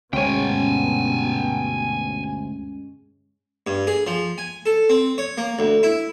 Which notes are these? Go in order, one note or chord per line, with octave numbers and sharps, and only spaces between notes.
D2 G2 B2 G#3 C#4 C#5 G5 G#5
G2
G#4
F3
G#5
A4
C4
C#5
A#3
D2
E4